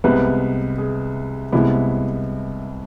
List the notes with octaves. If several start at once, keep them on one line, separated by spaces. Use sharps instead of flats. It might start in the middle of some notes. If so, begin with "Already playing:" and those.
C2 C3 G#3 B3 B4
G#4
C2 C3 G#3 B3 E4